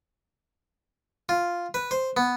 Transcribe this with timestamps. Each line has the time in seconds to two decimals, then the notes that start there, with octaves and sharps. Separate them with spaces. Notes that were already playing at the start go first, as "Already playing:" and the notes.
1.29 F4
1.74 B4
1.91 C5
2.17 B3